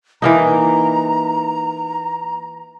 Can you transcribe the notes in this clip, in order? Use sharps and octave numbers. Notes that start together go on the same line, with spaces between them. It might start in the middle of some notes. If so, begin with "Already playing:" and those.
E3 A#3 D#4 A#5